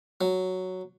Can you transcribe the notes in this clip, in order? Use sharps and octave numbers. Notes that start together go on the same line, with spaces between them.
F#3